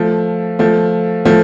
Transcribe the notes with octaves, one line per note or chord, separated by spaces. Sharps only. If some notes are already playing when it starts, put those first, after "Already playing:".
Already playing: F3 A3
F3 A3
F3 A3